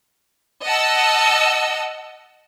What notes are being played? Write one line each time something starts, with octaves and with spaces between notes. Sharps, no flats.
D#5 F#5 A5 E6